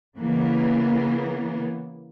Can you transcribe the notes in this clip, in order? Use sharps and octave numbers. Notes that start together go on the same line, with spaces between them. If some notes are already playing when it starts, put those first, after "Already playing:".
C#3 E3 A#3 B3